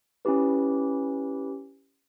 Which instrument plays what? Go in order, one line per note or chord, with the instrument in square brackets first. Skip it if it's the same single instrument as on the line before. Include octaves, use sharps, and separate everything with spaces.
[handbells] C#4 E4 G4 B4